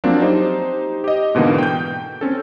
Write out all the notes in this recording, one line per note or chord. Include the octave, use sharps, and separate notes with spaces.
F3 F#3 A#3 C4 D4
D#4 G4 C5
G4 D#5
G#2 B2 D3 E3 A#3
G5 G6
C4 C#4 A4